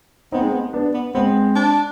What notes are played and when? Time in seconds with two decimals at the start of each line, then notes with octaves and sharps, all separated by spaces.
0.32 B3 C4 D#4
0.42 G#3
0.52 B3
0.73 B3 D4
0.93 B3
1.14 G#3 B3 C4
1.56 D4